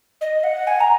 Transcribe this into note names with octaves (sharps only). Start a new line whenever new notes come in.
D#5
F#5
G#5
A#5